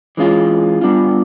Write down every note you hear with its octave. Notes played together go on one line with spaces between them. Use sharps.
E3 G#3 C#4 F4
G3 B3 D4 F4